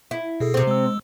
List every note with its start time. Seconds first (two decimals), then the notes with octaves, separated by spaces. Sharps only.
0.11 E4
0.40 B2 G#4 A4
0.54 C3 C4
0.67 G#3 E6